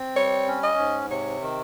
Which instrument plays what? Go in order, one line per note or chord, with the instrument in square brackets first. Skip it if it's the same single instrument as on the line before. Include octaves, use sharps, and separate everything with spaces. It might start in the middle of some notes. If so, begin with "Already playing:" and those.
Already playing: [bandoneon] C4
[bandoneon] G3 [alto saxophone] C#5
[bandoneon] C#4
[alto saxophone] D#5
[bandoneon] G#2
[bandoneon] C3 [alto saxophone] C#5
[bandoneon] D#3